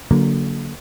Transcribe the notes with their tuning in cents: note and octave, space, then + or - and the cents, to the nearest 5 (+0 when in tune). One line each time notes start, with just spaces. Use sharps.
D3 -25 F#3 +0 A#3 +0